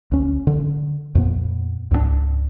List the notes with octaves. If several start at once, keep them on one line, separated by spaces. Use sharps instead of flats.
D2 C#4
D3
F2 A#2 B3
C#2 G#2 F3 D4